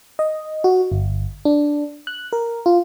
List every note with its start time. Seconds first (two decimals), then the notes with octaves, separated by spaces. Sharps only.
0.19 D#5
0.64 F#4
0.92 G1
1.45 D4
2.07 F#6
2.33 A#4
2.66 F4